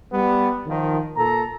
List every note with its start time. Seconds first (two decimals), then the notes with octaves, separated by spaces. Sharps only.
0.13 G3 B3
0.67 D#3 F3
1.16 A#2 A4 A#5